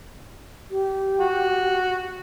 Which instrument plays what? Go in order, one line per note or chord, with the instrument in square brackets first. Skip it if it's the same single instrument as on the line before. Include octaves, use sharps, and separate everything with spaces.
[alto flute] G4
[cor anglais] F#4